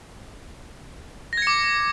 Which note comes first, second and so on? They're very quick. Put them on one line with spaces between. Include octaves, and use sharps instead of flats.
A#6 G#6 C#7 D6